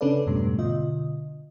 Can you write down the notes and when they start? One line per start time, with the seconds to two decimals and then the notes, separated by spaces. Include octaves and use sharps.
0.01 C#3 C#4 D4 A4 B4 D5
0.26 F2 G#2 B2 G3 A3
0.59 B2 D3 F4 D#5